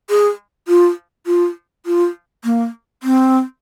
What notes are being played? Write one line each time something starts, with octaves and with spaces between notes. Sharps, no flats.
G#4
F4
F4
F4
A#3
C4